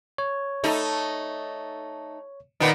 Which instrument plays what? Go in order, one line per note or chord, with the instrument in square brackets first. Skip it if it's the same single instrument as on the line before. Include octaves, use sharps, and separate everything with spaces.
[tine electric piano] C#5
[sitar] A3 D#4
[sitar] A#2 D#3 B3 [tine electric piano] D#4